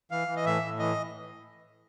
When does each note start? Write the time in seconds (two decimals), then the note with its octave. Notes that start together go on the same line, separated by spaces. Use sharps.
0.11 E3 F5
0.28 E3
0.36 D#5
0.46 A2 E5
0.62 A2
0.79 E3 D#5